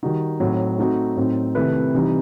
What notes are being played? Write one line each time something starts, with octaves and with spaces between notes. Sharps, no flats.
D#3 G3 D#4 F#4
A2 F#3 C4 D#4
A3 C4 D#4 F#4
A2 F#3 C4 D#4
C3 D#3 A3 E4 B4
C3 E3 G3 D#4